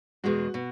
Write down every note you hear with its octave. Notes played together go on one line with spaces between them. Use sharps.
E2 B2 G#3 F#4
B2